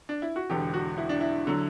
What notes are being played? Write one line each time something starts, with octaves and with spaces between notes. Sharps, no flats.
D4
E4
F#4
E1 E2 D3 G4
F#4
E4
D4
E4
D3 F#3